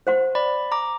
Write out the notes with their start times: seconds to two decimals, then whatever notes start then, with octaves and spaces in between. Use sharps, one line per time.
0.07 C5 F#5 C6
0.35 D5 B5
0.72 A#5 D6